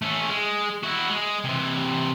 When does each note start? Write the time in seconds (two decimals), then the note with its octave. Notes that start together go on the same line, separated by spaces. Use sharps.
0.02 A3 C#4
0.29 G#3
0.83 E4 F#4
1.09 G#3
1.44 C3 E3